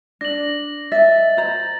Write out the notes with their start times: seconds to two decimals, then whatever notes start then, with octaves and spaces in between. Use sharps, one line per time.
0.21 D4 A#6 F#7
0.92 D#5 E5 A6
1.37 C5 A#5